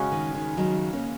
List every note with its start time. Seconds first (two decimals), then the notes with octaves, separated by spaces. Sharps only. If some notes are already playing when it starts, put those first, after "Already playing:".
Already playing: C#3 G#3 C#4 F#4
0.12 D#3
0.34 D#3
0.57 D#3 F#3
0.93 A#3 C#4